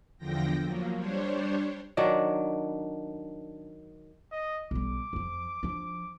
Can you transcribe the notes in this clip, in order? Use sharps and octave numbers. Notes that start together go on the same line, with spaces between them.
E2 D3 F3 G5 A#6
F3 F#3 A#3
G3 D4 C5 C#5
D#3 F#3 D4
D#5
B1 G3 D6
F2 F3
F3 D4